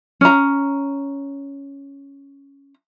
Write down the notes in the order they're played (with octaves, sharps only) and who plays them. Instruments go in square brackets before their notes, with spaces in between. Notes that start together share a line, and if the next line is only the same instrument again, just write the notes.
[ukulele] C#4 A#5